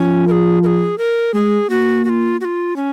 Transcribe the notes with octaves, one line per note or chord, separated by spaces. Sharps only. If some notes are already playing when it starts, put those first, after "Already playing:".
Already playing: F3 C#4
A#4
G#4
A#4
G#4
A#4
G#3 G#4
A#3 F#4
F#4
F4
F#4
F4
C#4